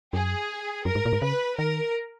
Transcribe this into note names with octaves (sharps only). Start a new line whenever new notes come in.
F#2 G#4
F#2 A#4
G#2
A#2
G#2
C#3 B4
D#3 A#4